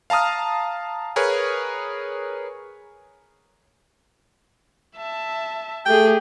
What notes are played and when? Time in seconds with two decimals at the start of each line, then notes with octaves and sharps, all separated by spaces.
0.10 F5 A5 A#5 D#6 F6
1.16 G#4 A#4 B4 C#5
4.97 E5 A5
5.86 A3 G4 G#4 G5